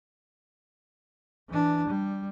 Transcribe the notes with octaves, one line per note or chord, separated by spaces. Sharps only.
E3 D4
G3